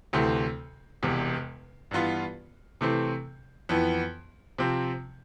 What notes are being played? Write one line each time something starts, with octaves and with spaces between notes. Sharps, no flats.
D2 C3 E3 A3 C4
E1 E2 C3
G2 E3 B3 F4
C3 E3 A3 C4
F2 E3 B3
C3 F3 C4